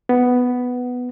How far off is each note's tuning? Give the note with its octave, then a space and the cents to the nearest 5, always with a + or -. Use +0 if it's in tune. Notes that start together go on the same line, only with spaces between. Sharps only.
B3 +5